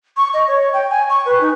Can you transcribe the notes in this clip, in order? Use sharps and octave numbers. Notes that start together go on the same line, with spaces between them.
C#6
D#5
C#5
G5
G#5
C#6
B4
D#4